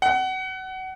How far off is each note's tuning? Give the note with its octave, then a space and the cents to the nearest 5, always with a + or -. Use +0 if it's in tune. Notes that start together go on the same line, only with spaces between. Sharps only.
F#5 +25